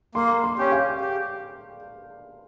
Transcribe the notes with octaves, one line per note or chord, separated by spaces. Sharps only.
A#3 C6
C6
C#4 G4
F5
G4